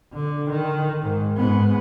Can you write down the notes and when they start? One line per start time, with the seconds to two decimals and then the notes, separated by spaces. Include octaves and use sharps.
0.13 D3
0.50 D#3
1.02 G#2
1.37 G#2 B3